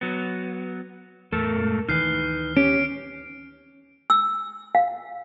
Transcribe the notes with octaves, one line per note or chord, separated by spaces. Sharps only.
F#3 B3
E2 A2 A3 A4 A#4
F#2 A#2 G#3
D2 D#3 E3 D#4 B4 F6 C7
C#4 G4 D7
E6
F5